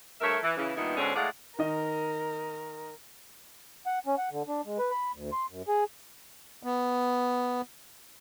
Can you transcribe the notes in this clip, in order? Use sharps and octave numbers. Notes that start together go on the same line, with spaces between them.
G2 A3 A#4 C#5 E5
E3
C#3 E3
G2 A#2 D#3 B3 D#4 E4
G#2 B2 D3 C4 C#4
A2 E3 G#3 D5 F5 F#5
D#3 A#4 D#5
F#5
C#4
F#5
D3
D4
G#3
B4
B5
D2
C6
F#2
G#4
B3